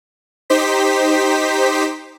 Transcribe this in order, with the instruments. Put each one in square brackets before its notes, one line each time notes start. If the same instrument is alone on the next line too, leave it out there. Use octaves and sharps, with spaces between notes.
[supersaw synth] D#4 G4 C5 B6